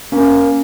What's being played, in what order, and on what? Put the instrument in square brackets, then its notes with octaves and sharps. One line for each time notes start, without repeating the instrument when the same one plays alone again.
[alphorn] A#3 [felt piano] C#4